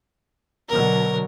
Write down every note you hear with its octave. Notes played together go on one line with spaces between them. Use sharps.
B2 D3 F#3 A#4